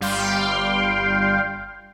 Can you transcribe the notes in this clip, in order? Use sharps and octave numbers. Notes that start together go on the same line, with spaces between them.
G1 G3 F5 G5 C6